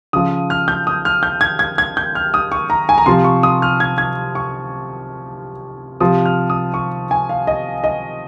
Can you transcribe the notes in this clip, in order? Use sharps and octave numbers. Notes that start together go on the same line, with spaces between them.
C#3 F3 D#6
F6
G6
D#6
F6
G6
G#6
G#6
G#6
G6
F6
D#6
C#6
A#5
G#5
A#5
C3 F3 C6
C#6
D#6
F6
G#6
G#6
C#6
C3 F3 D#6
F6
D#6
C#6
G#5
F5
D#5
D#5